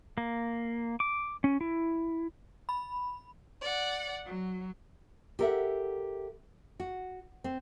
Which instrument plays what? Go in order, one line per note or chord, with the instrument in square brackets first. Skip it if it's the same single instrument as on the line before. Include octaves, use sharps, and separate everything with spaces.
[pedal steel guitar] A#3
D6
C#4
E4
[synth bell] B5
[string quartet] D5 F#5
F#3
[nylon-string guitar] G4 A4 A#4 D5 E5 F#5
F#4
C4